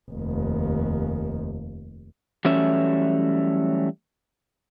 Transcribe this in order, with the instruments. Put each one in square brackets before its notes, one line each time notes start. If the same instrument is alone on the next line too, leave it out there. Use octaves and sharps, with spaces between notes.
[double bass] F1 D#2
[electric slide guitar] E3 F#3 G3 A3 C#4 E5